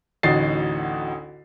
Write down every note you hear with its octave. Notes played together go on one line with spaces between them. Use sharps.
A1 D2 D#4 F#4 A6 C7